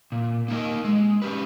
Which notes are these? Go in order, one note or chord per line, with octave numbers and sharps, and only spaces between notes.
A#2
A#3 D#4 A#4 D#5
G#3
C#4 G4 B4